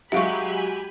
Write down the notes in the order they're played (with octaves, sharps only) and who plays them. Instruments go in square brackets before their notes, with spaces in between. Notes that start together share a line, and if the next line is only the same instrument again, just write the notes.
[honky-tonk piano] F#3 G#3 [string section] G4 G#5 B5 [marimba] E5 F5 C#6